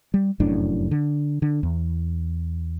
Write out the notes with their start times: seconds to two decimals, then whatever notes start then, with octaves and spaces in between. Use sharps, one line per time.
0.14 G3
0.40 F1 F#2 A2 D4
0.91 D3
1.42 D3
1.63 E2